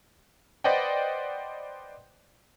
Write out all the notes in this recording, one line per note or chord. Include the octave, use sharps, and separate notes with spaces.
B4 C5 D5 D#5 F#5 G5